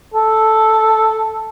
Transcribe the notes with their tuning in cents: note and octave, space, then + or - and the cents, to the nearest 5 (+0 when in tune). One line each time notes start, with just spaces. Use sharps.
A4 +0